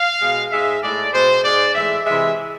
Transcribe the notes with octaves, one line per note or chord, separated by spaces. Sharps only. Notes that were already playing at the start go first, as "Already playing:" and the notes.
Already playing: F5
B2 G#3
G#2 G#3 E5
A2 G#3 D5
B2 G#3 C5
G#2 G#3 D5
A2 E3 G#3 E5
C3 E3 G#3 E5